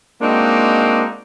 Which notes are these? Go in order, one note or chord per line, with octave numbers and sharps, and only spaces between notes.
G#3 A#3 C4 D4 D#4 F#4